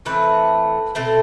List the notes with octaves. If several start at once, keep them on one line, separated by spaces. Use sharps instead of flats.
A2 E3 A3 C4 B4
B2 A3 C4